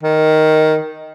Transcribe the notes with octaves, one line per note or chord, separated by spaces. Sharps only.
D#3